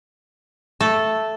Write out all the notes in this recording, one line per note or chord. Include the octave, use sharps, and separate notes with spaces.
A3 A4